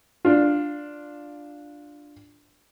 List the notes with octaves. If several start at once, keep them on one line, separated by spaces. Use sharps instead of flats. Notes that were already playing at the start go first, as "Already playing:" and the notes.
D4 F4